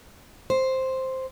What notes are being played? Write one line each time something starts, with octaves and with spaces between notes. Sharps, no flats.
C5